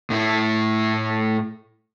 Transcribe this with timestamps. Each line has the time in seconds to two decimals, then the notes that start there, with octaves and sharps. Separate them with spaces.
0.10 A2 E4